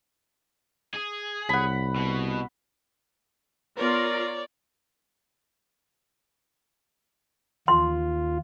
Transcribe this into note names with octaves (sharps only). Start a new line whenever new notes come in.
G#4
C2 F#5 B5
B2
B3 F4 A#4 B4 C#5 D5
D#2 F4 C6